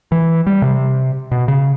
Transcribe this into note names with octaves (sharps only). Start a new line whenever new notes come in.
E3
G3
C3
B2
C#3